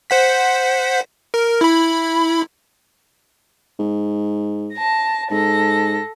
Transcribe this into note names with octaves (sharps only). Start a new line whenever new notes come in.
C5 F#5 B6
A#4
E4 B5
G#2
A5 A#6
G#2 A4 A#6